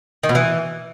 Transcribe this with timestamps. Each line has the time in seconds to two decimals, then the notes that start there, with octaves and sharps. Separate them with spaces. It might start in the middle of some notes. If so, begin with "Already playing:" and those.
0.23 D#3
0.29 B2
0.35 E3